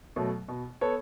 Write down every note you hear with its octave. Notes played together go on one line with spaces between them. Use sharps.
B2 F#3 A3
B2
B3 A4 C#5